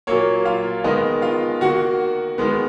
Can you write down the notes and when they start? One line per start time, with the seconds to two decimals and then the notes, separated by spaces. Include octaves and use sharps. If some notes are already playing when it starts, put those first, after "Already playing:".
0.07 A#2 F#3 A#3 C#5
0.45 F4 F5
0.84 D#3 G#3 B3 D#5
1.22 F4 F5
1.61 D#3 A#3 F#4 F#5
2.38 D#3 G#3 B3